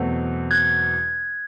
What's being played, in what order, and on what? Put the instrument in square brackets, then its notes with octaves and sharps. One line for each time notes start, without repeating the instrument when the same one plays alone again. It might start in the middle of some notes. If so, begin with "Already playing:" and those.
Already playing: [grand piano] E2 B2 F#3 A3 C4
[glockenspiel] F#6 G#6